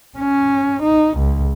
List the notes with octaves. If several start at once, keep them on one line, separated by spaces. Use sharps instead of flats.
C#4
D#4
C#2